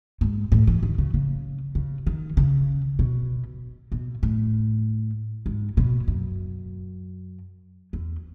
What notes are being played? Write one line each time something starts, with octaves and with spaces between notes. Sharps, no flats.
G#2
A2
E3
D#3
C#3
C#3
C#3
D#3
C#3
B2
B2
A2
G#2
B2
F#2
E2